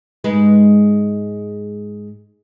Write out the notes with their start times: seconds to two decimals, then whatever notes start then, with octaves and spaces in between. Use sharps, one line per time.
0.24 G#2 G#3 B4